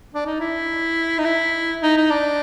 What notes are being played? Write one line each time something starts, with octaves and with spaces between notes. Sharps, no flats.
D4
D#4
E4
D#4
E4
D#4
D#4
D4